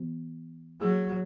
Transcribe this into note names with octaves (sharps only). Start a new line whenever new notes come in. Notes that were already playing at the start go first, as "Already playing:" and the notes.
Already playing: E3 B3 F#4
F#3 A#3 E4 G#4